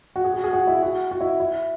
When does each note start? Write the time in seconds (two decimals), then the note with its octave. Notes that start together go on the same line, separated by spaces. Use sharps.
0.16 F#4
0.24 G#4
0.34 F#4
0.44 G#4
0.53 F#4
0.67 E4
0.82 F#4
1.11 F#4
1.21 E4
1.40 E4